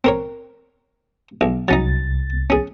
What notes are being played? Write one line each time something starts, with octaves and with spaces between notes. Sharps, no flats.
C4 A#4 C#5
B1
C2 F#3 C#4 D#4 A6
C#4 G#4